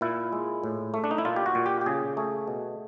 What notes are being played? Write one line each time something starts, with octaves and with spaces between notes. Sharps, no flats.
A#2 E4
G#3
A2
A3
D4
D#4
E4
A#2 F4
G4
F#4
A#2
G4
G4
C#3 G#4
A3 G#4
B2